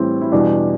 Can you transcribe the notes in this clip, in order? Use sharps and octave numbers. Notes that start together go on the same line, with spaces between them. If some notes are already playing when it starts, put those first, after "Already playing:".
Already playing: A2 E3 G3 C4
E4
E2 B2 G3 D4